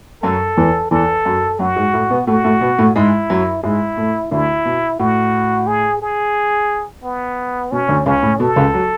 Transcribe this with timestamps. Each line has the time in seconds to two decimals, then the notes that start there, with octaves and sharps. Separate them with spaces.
0.23 F#2 F#3 A4
0.57 E2 E3
0.91 E2 E3 A4
1.25 F#2 F#3
1.59 F#2 F#3 F#4
1.76 G#2 G#3
1.94 A2 A3
2.10 B2 B3
2.27 A2 A3 F#4
2.44 A2 A3
2.61 B2 B3
2.78 A2 A3
2.96 G#2 G#3 E4
3.30 F#2 F#3
3.63 G#2 G#3 E4
3.97 A2 A3
4.31 D2 D3 E4
4.65 B2
4.99 A2 F#4
5.67 G#4
6.02 G#4
7.03 B3
7.72 B2 C#4
7.88 D2 D3
8.06 C#2 C#3 C#4
8.23 A2
8.40 B2 A4
8.56 C#2 C#3
8.74 F#3